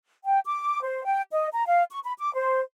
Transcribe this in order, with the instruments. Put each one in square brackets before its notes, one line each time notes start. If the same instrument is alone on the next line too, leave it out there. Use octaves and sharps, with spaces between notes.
[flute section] G5
D6
C5
G5
D#5
A#5
F5
C#6
B5
D6
C5